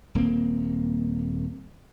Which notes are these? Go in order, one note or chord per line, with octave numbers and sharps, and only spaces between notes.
D#1 A#3 C4